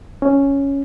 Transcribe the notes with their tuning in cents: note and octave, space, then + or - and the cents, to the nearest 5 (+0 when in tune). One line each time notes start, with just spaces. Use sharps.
C#4 +0